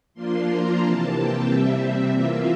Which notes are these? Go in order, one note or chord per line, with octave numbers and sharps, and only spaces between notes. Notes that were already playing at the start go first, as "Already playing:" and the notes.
F3 A#3 D4 F4 C6
A#5
C3 E3 A#3 A5
G5
C3 G3 C4 E5
E5
E3 A#3 F4